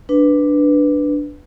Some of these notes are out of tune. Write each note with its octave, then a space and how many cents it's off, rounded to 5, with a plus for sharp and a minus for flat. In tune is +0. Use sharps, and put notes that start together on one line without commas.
D4 +0 B4 +0